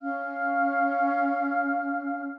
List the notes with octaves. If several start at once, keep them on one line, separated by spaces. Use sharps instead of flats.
C#4 F5 F6